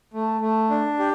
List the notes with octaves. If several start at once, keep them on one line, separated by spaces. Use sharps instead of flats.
A3
A3
D4
G4